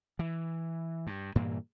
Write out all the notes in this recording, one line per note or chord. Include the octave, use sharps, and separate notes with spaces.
E3
G2
G2 A#2 E3 A#3